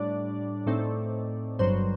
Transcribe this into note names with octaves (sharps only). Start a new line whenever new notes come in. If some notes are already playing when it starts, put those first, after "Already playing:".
Already playing: A2 G3 D4 D5
A2 A3 C4 D#4
G1 G2 F#3 C5